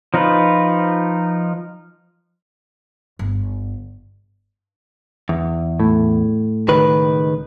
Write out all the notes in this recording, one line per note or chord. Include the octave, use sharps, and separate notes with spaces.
F3 D#4 F4 B4
G1
E2
A2
C#2 D#3 B4